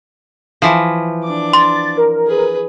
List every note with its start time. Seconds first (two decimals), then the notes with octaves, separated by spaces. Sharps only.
0.62 E3 F3
1.24 D4 D6
1.53 C6 A6
1.97 A#4
2.27 G#4 B4